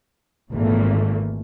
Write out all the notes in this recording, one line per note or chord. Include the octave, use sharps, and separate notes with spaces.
G#1 A#2 E3 A3 A#3